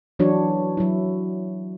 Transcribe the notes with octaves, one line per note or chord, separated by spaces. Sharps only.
E3 F#3 D4 F#4 C#5
F#3 E4